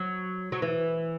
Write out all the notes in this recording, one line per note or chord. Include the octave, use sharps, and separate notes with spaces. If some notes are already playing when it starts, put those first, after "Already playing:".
Already playing: F#3
F#3
E3